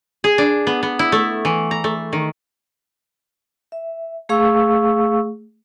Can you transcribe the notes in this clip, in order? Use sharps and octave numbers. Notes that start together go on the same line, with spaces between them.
G#4
D4
B3
B3
E4
A3
E3
A#5
A3
D#3
E5
A3 G#4 F5 C#6 E6